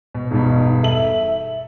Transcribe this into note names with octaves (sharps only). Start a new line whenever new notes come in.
B2
E1 G2 B2 D#4
A4 E5 F#7